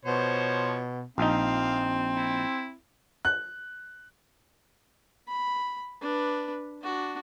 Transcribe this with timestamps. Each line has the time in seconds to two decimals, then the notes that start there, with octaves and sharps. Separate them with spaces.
0.05 B2 F3 C5 C#5
1.18 A#1 C4 D#4 F5
2.15 E4
3.25 F#6
5.28 B5
6.02 D4 B4
6.82 D4 F#4